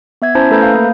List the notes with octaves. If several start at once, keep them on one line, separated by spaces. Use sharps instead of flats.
B3 E5 G#6
C#4 E4 C5 A5 A#5
A3 A4 B4 A#5 B5 G6
F5
A#3